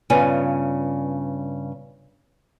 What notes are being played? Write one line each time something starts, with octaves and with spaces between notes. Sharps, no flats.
G2 C#3 B3 F4 G#5